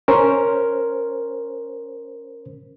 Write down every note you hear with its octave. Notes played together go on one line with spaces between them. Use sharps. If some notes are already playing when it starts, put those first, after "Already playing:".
C#4 A#4 C5